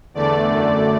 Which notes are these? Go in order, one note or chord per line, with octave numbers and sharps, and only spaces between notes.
E2 D3 A3 D5
F#2 D3 A3